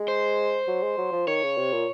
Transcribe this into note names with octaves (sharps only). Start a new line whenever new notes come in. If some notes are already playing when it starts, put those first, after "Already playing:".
Already playing: G#3
C5
F#3
G#3
F#3
F3
D#3 C#5
C#3
C3
A#2